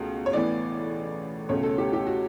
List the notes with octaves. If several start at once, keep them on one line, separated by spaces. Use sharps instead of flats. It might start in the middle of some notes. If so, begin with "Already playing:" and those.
Already playing: C#2 B2 A3
C#5
A1 A2 E3 B3 D5
C#2 B2 A3 C#4 C#5
A4
G4
G4
F#4